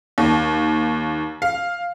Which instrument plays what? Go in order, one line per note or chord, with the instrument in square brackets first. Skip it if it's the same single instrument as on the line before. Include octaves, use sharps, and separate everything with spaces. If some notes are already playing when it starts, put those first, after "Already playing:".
[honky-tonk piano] D#2
F5